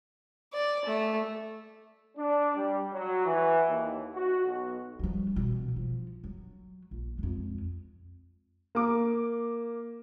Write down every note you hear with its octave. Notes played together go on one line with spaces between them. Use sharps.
D5
A3
D4
G3
F#3
E3
D#2
F#4
B1
F3 G3
B2 E3
F3
F#3
A#1
F2 G#3
A#3 D6